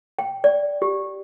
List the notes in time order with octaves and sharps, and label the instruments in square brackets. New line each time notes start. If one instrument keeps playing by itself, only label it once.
[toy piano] G5
D5
G4